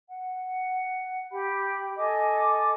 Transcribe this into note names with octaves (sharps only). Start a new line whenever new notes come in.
F#5
G4 B5
A4 D#5 G#5 D6